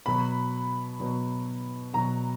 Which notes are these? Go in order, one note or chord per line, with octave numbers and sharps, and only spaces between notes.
B2 F#3 B5
B2 F#3
B2 F#3 A#5